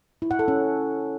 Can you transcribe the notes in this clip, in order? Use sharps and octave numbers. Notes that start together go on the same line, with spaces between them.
E4
F#5
A4
C#4